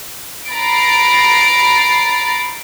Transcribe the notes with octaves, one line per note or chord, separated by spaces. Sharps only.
A#5 B5 A6 C7 D7